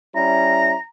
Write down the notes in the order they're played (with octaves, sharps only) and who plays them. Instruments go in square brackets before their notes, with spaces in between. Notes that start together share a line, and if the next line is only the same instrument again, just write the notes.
[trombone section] G3 C#4 E4 [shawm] A#5